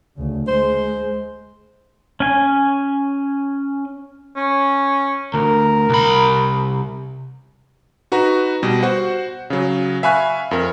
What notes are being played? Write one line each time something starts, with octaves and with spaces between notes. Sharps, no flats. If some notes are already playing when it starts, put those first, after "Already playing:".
D2 C#3
G#3 C5
C#4 G#5
C#4
D2 A#4
C2 B5
D#4 F#4 B4 A#5
B2 G3
F#4 C5 F#5
C#3 F#3
E5 F5 G#5 B5 C#6 F#6
F2 A#4